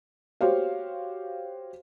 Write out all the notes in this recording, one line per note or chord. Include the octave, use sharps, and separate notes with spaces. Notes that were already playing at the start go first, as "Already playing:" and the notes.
F#4 G4 C5 C#5 F5